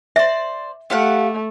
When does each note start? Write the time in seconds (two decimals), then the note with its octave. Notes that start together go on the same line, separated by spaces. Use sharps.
0.16 C5 D5 E5
0.90 A3 G4 F5 F#5